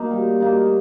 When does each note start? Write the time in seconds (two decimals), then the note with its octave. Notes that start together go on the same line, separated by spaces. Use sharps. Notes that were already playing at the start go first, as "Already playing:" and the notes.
Already playing: A#3 D#4
0.11 G3
0.40 A#3 D#4